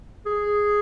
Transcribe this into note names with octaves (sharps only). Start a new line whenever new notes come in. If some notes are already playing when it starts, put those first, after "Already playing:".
G#4